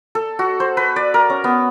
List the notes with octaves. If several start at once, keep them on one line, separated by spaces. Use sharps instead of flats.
A4
F#4
C5
B4
D5
A#4
C#4
B3